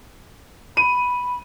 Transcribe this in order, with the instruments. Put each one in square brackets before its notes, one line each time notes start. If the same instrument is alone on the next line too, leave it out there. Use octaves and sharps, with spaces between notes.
[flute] B5 [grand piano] D#7